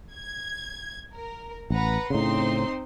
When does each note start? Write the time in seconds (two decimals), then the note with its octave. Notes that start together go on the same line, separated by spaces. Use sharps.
0.14 G#6
1.13 A#4
1.70 A1 B4 F#5 A#5
2.10 A2 C#3 C4 D#4 C6